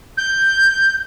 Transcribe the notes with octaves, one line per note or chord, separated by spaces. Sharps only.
G6